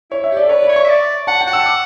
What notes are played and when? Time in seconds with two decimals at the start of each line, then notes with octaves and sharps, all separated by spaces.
0.11 E4 C#5
0.24 E5
0.31 G4
0.37 A4 D5
0.49 B4 C#5
0.63 D5
0.69 C#5
0.76 C#6
0.84 E5
0.89 D5
1.27 F#5 A5
1.41 G5
1.47 F#5
1.53 E6
1.66 D6